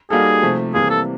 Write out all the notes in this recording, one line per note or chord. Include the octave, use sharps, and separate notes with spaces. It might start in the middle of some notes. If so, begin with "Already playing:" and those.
G3 A#3 D#4 F#4 G#4 A4
C3 F3 A3
C3 E3 G3 A#3 G#4
A4